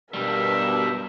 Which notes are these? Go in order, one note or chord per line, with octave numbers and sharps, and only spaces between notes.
G2 B2 G3 A#4 E5